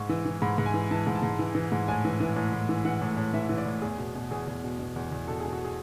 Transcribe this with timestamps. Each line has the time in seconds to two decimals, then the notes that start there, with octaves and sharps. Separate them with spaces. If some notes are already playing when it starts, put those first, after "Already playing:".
Already playing: G#2 C#6
0.09 E3
0.26 E3
0.42 G#2 B5
0.58 G#2
0.66 G#5
0.74 E3
0.91 E3 A5
1.07 G#2
1.15 A5
1.23 G#2
1.39 E3
1.55 E3
1.72 G#2
1.88 A2 G#5
2.05 E3
2.20 E3
2.36 A2
2.53 A2
2.69 E3
2.85 E3 F#5
3.01 A2
3.17 A2
3.33 E3 E5
3.49 E3
3.58 D5
3.65 A2
3.82 E2 G#4
3.98 B2
4.15 B2
4.31 E2 G#4
4.47 E2
4.64 B2
4.79 B2
4.96 E2
5.12 E2
5.27 B2 A4
5.40 B2 G#4
5.53 F#4
5.65 G#4